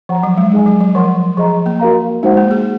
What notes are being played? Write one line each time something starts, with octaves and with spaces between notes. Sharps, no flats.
F3 C#5 F#5 A#5
F#3
G#3
G#3 D#4 G#4 D#5 G#5
F#3
F#3
F3 A#4 C#5 F#5 C6
F3 G#4 D#5 A#5
A#3
F#4 A#4 F5 A#5
G#3 D#4 F#4 C5 F#5
A#3
G#4